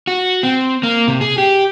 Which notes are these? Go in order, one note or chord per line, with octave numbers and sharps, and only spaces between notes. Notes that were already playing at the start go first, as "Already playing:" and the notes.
F#4
C4
A#3
C3
G#4
G4